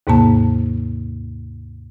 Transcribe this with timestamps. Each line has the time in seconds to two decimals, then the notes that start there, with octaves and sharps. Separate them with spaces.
0.07 D#2 G#2 C3 A#3 A5